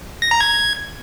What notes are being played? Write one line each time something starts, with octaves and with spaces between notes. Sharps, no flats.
A#6
A#5
G#6